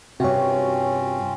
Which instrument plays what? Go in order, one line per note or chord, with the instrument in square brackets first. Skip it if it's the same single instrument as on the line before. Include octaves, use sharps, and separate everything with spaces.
[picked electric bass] G2 C3 [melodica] C4 C#4 F4 [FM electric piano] F#4 C#5